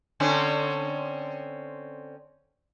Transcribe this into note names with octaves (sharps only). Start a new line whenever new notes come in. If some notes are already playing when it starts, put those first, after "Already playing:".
D3 C4 C#4